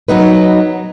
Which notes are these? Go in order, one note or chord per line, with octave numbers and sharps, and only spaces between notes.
F#3 B3 D#4 B4